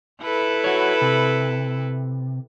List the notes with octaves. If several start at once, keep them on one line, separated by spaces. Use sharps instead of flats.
E4 A4 B4
F#4 C#5
C3